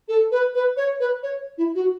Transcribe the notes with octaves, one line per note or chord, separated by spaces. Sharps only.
A4
B4
B4
C#5
B4
C#5
E4
F#4